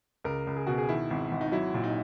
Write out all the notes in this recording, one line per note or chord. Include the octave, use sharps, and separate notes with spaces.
C#2 A#4
C#2
G#4
B2 F#4
G#4
D#3 E4
G#1
G#1
D#4
F#3 E4
A#2
D#4